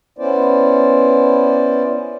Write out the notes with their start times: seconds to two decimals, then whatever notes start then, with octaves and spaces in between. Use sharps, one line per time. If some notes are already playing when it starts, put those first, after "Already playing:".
0.19 B3 C#4 E4 C5 D5